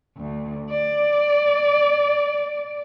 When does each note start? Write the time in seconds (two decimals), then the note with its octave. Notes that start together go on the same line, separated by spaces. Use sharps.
0.17 D2
0.70 D5